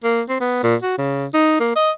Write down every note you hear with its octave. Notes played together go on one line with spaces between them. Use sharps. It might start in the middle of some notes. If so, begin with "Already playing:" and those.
A#3
C4
B3
A#2
F#4
C#3
D#4
A#3
D#5